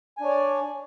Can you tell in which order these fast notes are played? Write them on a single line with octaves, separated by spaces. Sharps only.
G#5 D4 C#5 D5